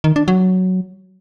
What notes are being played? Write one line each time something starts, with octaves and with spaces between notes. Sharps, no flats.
D#3
D4
F#3